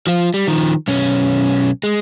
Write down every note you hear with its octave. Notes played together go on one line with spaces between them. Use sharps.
F3 F4
G3
D#3 F3
B1 C#4
G#3